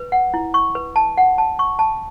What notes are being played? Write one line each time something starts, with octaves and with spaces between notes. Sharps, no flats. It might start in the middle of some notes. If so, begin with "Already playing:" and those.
Already playing: B4
F#5
E4
C#6
B4
A5
F#5
A5
C#6
A5